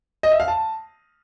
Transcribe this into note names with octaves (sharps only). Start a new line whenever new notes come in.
D#5
E5
F5
A5